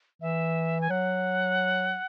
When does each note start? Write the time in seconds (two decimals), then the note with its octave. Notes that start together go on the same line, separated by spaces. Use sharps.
0.21 E3 E5
0.81 G#5
0.90 F#3 F#5